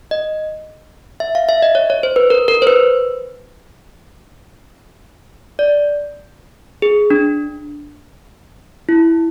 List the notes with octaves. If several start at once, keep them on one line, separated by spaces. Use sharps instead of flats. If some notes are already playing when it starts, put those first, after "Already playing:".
D#5
E5
F5
E5
D#5
C#5
C#5
C5
B4
A#4
A#4
C5
B4
D5
G#4
D4
E4